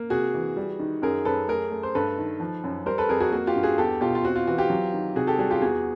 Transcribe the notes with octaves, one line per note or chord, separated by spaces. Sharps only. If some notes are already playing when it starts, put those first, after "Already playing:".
Already playing: A#3
C3 F#4 G#4
E3
G3
D#3
F#2 G#4 A#4
F#2 A4 B4
A3 G#4 A#4
A3
C5
G2 A4 B4
D#3
F3
F#2
G3 A#4 C5
A4 B4
F2 G#4 A#4
F#4 G#4
A#3 F#4
F4 G4
G2
F#4 G#4
E2 G4 A4
B2 F4 G4
F4
C4 F#4
F4
E3 F#4
F4 G4
F#3
D#3
C3 F#4 G#4
G4 A4
G3 F#4 G#4
F4 G4
E2 F#4 G#4